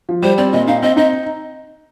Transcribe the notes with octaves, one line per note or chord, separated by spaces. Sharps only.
F3
G3 C5
C4 D5
A#2 D#5
D#4 F5
C4 D#5
D#4 D#5